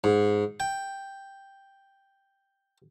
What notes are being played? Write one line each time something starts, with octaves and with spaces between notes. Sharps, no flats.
G#2
G5